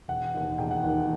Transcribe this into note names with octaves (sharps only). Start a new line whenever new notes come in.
E1 F#5
D#2 D#3
E1 G5
F#5
D#2 D#3